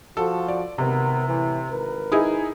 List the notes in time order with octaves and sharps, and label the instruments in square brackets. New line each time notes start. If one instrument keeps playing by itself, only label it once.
[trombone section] F3 F#4 [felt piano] A4
[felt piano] D5
[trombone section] G#1 B3 A#4 [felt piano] C3
[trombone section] A2 E3
G#1 A#4 B4
[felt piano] D#4 E4 G#4